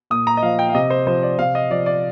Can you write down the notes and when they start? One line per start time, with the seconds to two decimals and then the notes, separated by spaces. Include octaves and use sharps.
0.10 A#2 D#6
0.27 A#5
0.37 D#5
0.43 F3 F5
0.59 G5
0.69 F5
0.74 C3 D#5
0.90 C5
1.07 F3 C5
1.23 D5
1.38 C3 F5
1.55 D#5
1.70 F3 D5
1.86 D5